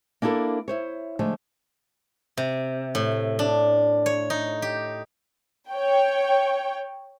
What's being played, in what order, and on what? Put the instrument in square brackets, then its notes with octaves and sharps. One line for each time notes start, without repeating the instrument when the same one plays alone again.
[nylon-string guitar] A#3 D4 E4 G4 A4 A#4
E4 C5 C#5
D3 F3 G#3 A3
[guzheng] C3
A2
D4
C#5
D#4
G4
[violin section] C#5 G5